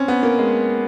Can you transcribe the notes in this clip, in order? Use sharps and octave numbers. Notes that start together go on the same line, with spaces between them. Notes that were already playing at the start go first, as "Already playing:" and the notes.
Already playing: C4 C#4
B3
A#3
G#3